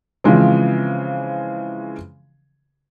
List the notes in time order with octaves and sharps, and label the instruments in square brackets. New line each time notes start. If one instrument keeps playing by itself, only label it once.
[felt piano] C#3 E3 F3 G#3 C4